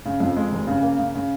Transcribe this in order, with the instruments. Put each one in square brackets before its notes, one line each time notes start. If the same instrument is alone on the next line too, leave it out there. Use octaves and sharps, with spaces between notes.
[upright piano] C#3
F2
G#3
F1
C#3
A#3
C#3
C#3